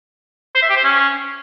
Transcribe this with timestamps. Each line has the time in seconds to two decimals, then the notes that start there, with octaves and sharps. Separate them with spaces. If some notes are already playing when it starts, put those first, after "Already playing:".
0.55 C5
0.62 E5
0.69 G4
0.77 C5
0.84 C#4